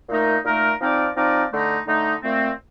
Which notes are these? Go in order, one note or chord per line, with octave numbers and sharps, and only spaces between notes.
A#2 A3 D#4 A#4
A#2 A3 D#4 A#4
F3 C4 D#4 A#4 D5
F3 C4 D#4 A#4 D5
D3 A3 D#4
D3 A3 D#4
A#2 A3 C4